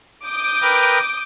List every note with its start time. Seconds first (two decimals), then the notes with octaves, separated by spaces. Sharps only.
0.24 D6 D#6 G6
0.62 A#4 B4 G5